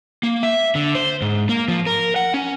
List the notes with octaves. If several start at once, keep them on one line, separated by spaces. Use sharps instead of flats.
A#3
E5
D3
C5
G#2
A#3
F3
A#4
F#5
C#4